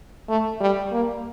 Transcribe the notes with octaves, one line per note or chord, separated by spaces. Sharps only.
A3
G3
A#3